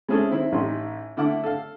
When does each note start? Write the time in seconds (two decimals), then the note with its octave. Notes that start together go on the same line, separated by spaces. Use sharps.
0.08 G#3 C4 C#4 E4 G#4 A4
0.31 D#3 C4 E4
0.52 A1 D#4 E4 G4 C6
1.17 D3 A3 E4 E5 F#5 D6
1.43 A4 F5